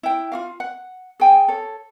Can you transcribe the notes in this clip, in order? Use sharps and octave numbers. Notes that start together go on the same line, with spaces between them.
E4 G5
F4 F#4 F5
F#5
G#4 G5 G#5
A4 C#5